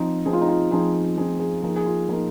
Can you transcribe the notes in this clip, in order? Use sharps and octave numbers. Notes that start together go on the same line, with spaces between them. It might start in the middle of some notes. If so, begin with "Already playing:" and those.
Already playing: F3 C4 D#4
F3 C4 D#4 G#4
F4
D#4
F4
F3 C4 D#4 G#4
F3 C4 D#4 G#4
G#4
F3 A#3 D#4 G#4
G#4
F4
F3 A#3 D#4 F4